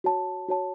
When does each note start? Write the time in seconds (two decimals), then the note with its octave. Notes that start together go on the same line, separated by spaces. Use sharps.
0.04 F#4 C#5 A5
0.48 F#4 C#5 A5